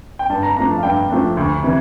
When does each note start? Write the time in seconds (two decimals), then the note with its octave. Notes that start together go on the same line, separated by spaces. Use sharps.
0.19 G5
0.30 G2 A5
0.43 A#5
0.57 F3 A3 D4 A#5
0.71 A5
0.77 F5
0.83 G2 G5
1.10 F3 A3 D4
1.37 D2
1.63 C3 E3